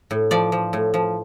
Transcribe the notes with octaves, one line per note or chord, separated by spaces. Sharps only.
A2
F3 D5
F3
A2
F3